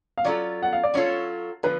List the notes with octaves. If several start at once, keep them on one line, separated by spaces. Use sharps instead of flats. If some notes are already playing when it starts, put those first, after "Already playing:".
F5
F#3 C#4 F4 A4 D5
F#5
F5
D5
F#3 C#4 F4 A4 C#5
D3 F3 B4